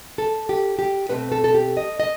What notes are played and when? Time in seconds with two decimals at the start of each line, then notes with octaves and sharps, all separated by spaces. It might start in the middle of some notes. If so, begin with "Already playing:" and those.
0.18 A4
0.49 G4
0.79 G4
1.09 B2 A3 C4 B4
1.32 A4
1.44 A4
1.54 G4
1.77 D#5
2.00 D#5